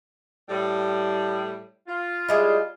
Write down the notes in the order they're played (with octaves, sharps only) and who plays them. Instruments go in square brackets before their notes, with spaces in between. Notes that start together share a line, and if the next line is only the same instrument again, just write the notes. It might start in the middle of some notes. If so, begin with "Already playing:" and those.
[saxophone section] A2 G3
F4
[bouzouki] G3 G#3 E4